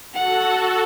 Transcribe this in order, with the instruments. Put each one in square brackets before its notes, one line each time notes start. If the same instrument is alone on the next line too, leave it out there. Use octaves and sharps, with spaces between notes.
[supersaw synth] F#4 A4 [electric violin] F#5